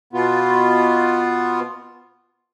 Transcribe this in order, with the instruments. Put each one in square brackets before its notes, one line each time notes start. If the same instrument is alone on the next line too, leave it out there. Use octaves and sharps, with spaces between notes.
[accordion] B2 B3 F4